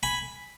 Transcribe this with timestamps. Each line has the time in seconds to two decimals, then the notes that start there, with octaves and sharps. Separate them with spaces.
0.03 G#5 B5